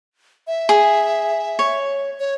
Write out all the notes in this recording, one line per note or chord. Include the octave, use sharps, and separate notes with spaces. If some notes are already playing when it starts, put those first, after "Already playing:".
E5
G#4
C#5
C#5